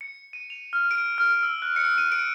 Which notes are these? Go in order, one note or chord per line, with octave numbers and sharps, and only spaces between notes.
C#7
D#7
F7
F6
D7
F6
E6
F#6
C#7
D#7
D7